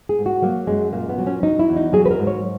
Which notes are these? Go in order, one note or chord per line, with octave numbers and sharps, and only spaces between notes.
G#4
G#2
F#4
F#3 A#3
F#2 G#3
A#2 A#3
B3
F#3
C#4
F#3 D#4
E4
E2
D#4
F#3 G#4
B4
A#4
G#2
C#5